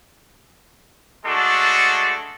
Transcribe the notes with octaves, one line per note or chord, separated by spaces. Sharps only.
G#3 A3 D4 F#4 A4